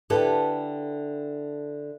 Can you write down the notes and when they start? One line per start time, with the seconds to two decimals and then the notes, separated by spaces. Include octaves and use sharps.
0.10 D3 E4 G4 A4 B4